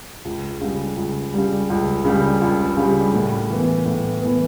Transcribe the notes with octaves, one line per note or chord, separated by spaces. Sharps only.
C#2
C#3 G3
C#2
C#3 G3
C#2
C#3 G3
C#2
C#3
G3
A2
E3 B3
A2
E3 B3